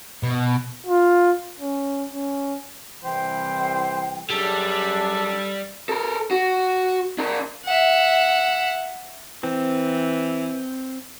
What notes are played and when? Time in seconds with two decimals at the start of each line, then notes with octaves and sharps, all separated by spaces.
0.23 B2
0.87 F4
1.60 C#4
2.14 C#4
3.04 C2 E3 C5 G5
4.30 F#2 G3 D4 G#4 A4
5.89 A4 A#4
6.31 F#4
7.19 D4 A#4
7.65 E5 F#5
9.43 E3 C4